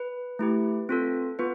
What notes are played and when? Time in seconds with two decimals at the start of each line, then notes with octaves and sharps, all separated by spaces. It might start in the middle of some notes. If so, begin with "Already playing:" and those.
Already playing: B4
0.39 A3 E4 G4
0.89 C4 F4 A4
1.39 B3 F4 B4